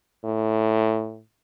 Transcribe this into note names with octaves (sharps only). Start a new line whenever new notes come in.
A2